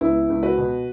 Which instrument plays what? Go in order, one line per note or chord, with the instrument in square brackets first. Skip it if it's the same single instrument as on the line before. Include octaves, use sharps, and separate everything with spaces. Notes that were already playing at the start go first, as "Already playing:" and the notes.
[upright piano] C#2 B3 E4
C#2
F#4 B4
B2